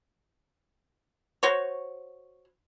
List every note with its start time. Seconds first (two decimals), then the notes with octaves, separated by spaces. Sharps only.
1.43 F#4 C5 C#5